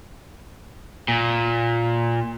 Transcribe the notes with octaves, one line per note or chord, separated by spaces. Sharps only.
A#2